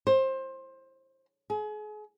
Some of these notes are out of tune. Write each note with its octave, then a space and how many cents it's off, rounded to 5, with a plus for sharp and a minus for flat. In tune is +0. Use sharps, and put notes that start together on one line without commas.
C5 +20
G#4 +35